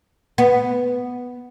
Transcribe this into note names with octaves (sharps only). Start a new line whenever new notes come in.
B3